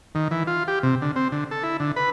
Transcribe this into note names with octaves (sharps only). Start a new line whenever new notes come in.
D#3
E3
F4
G4
C3
D3
C4
D3
A4
E4
D3
B4